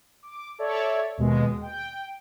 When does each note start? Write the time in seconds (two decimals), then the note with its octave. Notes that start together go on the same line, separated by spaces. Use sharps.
0.23 D6
0.59 A4 C#5 D5 E5
1.18 D#2 B2 G#3
1.62 G5